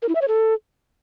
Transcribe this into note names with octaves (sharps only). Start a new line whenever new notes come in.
A#4
E4
E5
C#5
A4